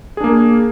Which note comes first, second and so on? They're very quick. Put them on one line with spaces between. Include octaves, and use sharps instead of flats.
G#4 D4 A#3